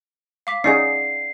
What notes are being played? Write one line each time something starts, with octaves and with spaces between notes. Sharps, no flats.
F5 D6 B6
C#4 D#4 G#4 D5 F#5 C7